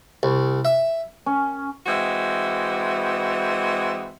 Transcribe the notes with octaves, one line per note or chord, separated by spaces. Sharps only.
C2
E5
C#4
E3 G#3 C4 F#4 D#5 E5